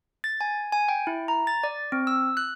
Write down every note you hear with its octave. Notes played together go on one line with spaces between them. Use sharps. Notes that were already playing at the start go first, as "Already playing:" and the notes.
A6
G#5
G#5
G5
E4
A#5
A6
D5
C4
E6
F#6